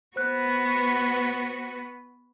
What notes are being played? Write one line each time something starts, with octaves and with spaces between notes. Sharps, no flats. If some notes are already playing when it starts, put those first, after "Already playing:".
B3 F#4 B4 C5 F#6